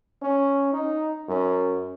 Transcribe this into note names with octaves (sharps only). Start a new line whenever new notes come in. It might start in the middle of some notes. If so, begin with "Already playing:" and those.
C#4
D#4
F#2